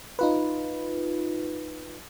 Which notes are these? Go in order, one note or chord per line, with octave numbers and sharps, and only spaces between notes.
D#4 F4 B4